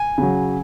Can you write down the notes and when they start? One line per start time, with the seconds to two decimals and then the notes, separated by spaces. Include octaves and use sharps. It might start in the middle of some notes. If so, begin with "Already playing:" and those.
Already playing: G#5
0.18 C#3 F#3